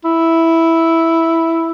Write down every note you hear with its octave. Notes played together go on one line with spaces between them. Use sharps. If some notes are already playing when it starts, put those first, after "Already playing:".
E4